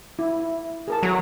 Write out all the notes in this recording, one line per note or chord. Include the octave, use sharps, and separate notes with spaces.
E4
G#4 A#4 A5
F#3 A4 A#5